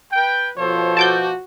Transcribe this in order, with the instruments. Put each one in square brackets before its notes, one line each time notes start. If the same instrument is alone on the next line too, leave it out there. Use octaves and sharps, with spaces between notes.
[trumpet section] B4 G5
[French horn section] B2 F3 [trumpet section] A4 C5 C#5
[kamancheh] F#4 [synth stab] A5 D6 G6